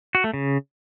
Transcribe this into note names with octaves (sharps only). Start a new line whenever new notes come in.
F#4
A3
C#3